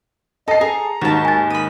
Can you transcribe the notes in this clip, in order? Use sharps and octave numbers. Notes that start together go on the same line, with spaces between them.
A4 D#5 A5 C7
G#4 A4 A#5
D#2 G#2 F#4 A5
G#5 A6
B5 D#6